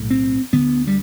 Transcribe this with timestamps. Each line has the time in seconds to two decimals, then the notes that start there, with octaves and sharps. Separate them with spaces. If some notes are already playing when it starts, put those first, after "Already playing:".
Already playing: B1 A2
0.10 C4
0.53 D2 D3 B3
0.87 G3